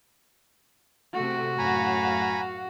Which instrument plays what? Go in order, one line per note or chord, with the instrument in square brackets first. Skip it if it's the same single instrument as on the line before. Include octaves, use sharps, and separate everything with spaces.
[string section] C3 A3 [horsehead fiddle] F#4
[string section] F#2 A2 F5 [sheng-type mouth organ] G#5 A#5 B5